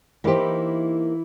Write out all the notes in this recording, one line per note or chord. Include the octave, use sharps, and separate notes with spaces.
E3 A#3 D#4 E4 G4 C5